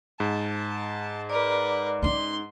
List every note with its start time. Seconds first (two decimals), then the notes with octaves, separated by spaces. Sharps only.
0.20 G#2 A5
1.30 A#4 B4 D5 D6
2.03 C#4 D#4 C6